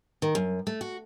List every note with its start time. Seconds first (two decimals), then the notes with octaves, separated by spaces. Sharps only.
0.22 D#3
0.35 F#2
0.67 A3
0.81 F#4